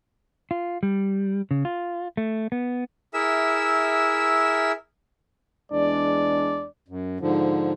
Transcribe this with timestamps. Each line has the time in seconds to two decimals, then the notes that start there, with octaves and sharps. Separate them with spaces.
0.51 F4
0.83 G3
1.51 C#3
1.65 F4
2.17 A3
2.52 B3
3.14 E4 G#4 A#4 E5 E6
5.71 E2 G#3 D4 D5
6.88 F#2
7.20 G#2 D3 F3